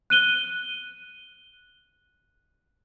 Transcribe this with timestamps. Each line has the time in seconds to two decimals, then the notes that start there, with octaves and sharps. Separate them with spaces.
0.10 F#6 D#7 G7